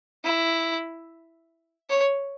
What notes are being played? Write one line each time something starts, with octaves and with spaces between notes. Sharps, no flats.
E4
C#5